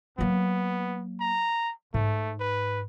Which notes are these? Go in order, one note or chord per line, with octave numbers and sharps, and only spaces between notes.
F#3 A#3 B3
A#5
G#2 A3
B4